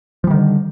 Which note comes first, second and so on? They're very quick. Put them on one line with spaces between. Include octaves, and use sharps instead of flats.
F3 G3 D#3 D3